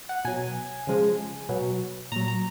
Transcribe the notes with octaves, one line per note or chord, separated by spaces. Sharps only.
F#5
B2 F#3 G#5
C#3 F3 G#3
B2 F#3
A#2 F#3 A#5
A#5